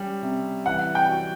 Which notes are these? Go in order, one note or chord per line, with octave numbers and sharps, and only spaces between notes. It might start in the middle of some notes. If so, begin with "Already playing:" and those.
Already playing: G3 C#4
C3
E3 F#5
G5
F#4